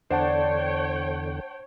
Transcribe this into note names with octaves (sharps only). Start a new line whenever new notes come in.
E2 D3 D4 C5 C#5 F#5 G5 A5